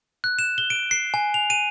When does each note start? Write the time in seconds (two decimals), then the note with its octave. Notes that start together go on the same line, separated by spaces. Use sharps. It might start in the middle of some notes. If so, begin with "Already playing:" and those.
0.24 F#6
0.39 E7
0.58 G7
0.70 D7
0.91 C7
1.14 G#5
1.34 F7
1.50 D#7